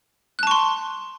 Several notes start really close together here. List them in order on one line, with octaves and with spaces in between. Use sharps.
F#6 A5 C#6 C6